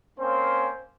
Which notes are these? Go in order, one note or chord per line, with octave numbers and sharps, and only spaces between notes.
A#3 C4 C#4 C5